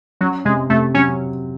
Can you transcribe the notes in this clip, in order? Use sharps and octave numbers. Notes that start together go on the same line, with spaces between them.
F#3 C#4
C3 G#3
C3 A3
F#3 C#4